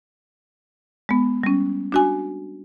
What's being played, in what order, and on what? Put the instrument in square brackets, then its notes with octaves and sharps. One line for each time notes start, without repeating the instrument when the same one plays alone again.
[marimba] G#3 B3
G3 C#4
D4 F#4 G#5